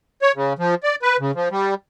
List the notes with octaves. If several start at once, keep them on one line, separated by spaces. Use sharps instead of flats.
C#5
C#3
F3
D5
B4
C#3
F3
G3